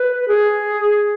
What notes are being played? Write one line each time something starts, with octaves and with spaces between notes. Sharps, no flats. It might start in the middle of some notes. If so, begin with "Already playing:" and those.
Already playing: B4
G#4